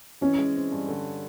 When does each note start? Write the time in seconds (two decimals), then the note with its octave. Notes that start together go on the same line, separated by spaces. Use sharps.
0.21 E3 C#4
0.38 G#3
0.55 C4
0.72 G2
0.88 D3